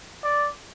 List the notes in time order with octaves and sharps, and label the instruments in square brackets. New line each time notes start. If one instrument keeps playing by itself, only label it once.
[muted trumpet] D5